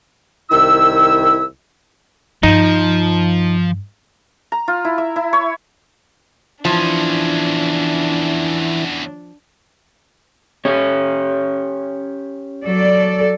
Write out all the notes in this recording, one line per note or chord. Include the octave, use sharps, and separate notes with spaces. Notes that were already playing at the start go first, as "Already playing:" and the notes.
C2 D#3 E4 E6
G2 F3 D#4
A#5
F4
E4
E5
E4
C#5
E2 E3 F3 C#4 D4 E4
C#4 G4 C#5
F#3 A4 D5